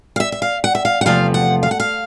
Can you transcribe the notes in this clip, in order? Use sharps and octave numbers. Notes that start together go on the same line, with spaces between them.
F5
E5
E5
F5
F#5
E5
F5
F#5
E2 C3 F3 A3 F5
F#5
F5
F#5
F5